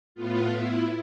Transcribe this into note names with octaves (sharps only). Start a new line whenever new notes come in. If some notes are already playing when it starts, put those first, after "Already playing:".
A2 B3 F4
E4